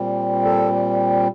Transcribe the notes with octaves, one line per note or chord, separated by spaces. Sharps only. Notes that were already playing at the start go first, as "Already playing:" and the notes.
Already playing: A#2 G3 C4
A4